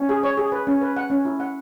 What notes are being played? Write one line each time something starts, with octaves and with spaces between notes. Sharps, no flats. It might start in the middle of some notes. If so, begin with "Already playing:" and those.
Already playing: C#4
G#4
C#5
G#4
B4
C#4
B4
F#5
C#4
E4
F#5